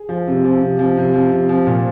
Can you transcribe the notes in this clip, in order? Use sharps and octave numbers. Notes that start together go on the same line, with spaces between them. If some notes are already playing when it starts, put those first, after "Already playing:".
Already playing: G#4
F3
C3
F3
C3
F3
C3
F3
C3
F3
A#2